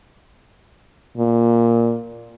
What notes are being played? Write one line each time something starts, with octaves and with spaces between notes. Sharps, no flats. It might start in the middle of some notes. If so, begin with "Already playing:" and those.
A#2